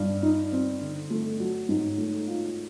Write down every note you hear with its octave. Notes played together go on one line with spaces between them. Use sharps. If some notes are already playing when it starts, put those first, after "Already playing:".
Already playing: G2
D#4
C4
D3
A3
F#3
G#2
A3
F4